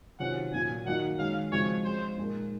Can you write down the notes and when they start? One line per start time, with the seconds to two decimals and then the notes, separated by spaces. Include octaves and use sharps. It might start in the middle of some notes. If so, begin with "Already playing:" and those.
0.19 C3 D#3 F#3 C#4 F4 F#5
0.52 A#2 F#3 C#4 G#5
0.86 D#3 F#3 A#3 D#4 F#4 F#5
1.18 D#3 G#3 C#4 F5
1.52 C#3 F3 G#3 C4 F#4 C#5
1.84 G#3 C#4 G#4 C5
2.18 A#2 G#3 D#4 A#4